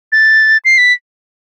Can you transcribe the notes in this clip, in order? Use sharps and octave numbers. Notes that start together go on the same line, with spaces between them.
A6
C7
B6